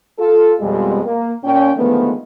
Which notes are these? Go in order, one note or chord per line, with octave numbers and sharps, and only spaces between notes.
F4 A4
F2 B2 G3 G#3
A#3
A#2 C#4 G5
D3 D#3 F3 G#3 A3 B3